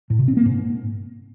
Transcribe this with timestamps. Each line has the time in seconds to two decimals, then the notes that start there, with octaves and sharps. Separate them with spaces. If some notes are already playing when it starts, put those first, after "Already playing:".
0.10 A2
0.19 C3
0.28 C4
0.37 A#3
0.46 G#2